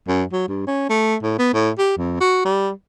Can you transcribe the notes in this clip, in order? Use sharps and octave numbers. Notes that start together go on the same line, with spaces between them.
F#2
F#3
G2
C#4
A3
A2
B3
A2
G4
F2
F#4
G3